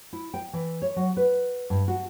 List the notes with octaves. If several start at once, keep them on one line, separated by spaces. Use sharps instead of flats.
E4
G5
E3
C#5
F#3
B4
G2
F#4